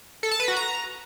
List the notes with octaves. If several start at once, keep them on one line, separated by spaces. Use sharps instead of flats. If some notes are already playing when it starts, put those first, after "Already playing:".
A4
A5
B4
F#4
A#5